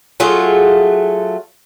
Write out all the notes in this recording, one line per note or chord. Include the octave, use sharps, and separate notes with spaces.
F#3 A3 F4 G#4